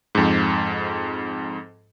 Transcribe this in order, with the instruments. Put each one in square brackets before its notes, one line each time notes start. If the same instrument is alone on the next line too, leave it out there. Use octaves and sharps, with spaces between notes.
[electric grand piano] F2 G#2